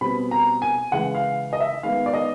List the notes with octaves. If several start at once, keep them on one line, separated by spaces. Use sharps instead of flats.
B2 G3 C4 B5
A#5
G#5
C#3 E3 G#3 F#5
F5
D#5
E5
D#3 G#3 B3 F5
D5
D#5